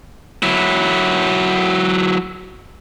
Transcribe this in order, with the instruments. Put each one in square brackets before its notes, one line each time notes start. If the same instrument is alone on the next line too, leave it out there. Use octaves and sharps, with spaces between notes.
[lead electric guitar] F#3 E4